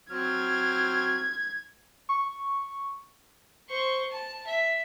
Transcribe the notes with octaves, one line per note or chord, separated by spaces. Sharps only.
F#3 C4 F6 G#6
C#6
C5 C#6
A5
E5